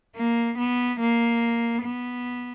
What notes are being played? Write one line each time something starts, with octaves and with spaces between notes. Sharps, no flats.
A#3
B3
A#3
B3